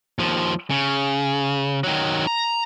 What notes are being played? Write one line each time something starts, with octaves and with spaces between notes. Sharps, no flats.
D#2 F3
C#3
D#3 F#3
A#5